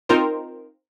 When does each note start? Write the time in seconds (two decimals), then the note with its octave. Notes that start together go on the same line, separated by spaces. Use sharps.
0.09 C4 D#4 F4 A#4 C5